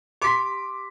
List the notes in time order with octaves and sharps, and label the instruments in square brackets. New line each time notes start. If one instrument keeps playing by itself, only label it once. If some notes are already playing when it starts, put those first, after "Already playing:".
[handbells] G4 C6 D7 [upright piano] D6 B6